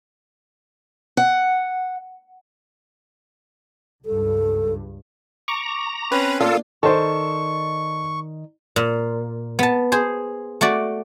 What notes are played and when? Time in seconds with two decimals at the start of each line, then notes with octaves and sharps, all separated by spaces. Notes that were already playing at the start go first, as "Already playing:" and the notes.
1.17 F#5
4.05 C#2 G2 A4
5.48 A#5 C#6 D6
6.12 C4 C#4 B4
6.40 A#2 A#3 D4 F4 A4
6.83 D#3 A4 C5 D5 C#6
8.76 A#2
9.59 B3 A5
9.92 G#4 C5
10.61 A3 F#4 D5